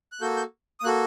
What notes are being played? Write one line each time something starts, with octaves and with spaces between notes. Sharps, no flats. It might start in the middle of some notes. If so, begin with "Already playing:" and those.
F#6
A#3 F#4 A4 G6
G6
D#6
A#3 F#4 A4 F#6